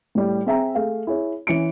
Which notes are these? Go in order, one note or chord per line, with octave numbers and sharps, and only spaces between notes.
A2 G3
C4 G#4 E5 G5 A#5
A3 G#4 F5
E4 G#4 C#5
E3 C#4 C#7 D7